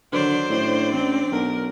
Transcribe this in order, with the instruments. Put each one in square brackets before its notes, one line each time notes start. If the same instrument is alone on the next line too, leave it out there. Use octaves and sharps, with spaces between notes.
[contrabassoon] D3 [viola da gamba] D#3 F#3 D5 [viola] C5
[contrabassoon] A2 [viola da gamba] C#4 D4 D5
[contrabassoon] A1 [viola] C4
[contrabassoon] B1 [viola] A#4